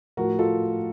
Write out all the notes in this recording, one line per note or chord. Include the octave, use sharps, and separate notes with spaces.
A2 F3 A3 F#4 A#4
F4 A4